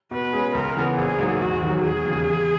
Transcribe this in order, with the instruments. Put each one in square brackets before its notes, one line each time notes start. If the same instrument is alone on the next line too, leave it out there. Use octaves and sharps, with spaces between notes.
[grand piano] B2 [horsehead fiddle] B4
[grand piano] G#3 C#4 G#4
[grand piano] C#2 [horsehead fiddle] A#4
[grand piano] C#3 E3 B3
[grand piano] A#1 [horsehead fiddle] G#4
[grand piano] G#2 F#3 A#3
[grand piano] E1 [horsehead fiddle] F#4
[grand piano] D#2 D#3 F#3
[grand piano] E1 [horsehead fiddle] G#4
[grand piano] D#2 C#3
E2